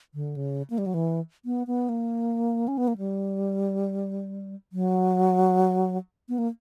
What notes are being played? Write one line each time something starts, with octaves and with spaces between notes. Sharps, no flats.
D3
C#3
A#3
G3
F#3
E3
B3
B3
A#3
C#4
B3
A#3
G3
F#3
B3
A#3